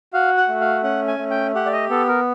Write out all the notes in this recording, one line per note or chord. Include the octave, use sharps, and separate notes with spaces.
F#4 F5
F#5
A3
F5
C#4 F#5
G#5
A3
G5
G4 F#5
D5
D#5
B3 A4
A#4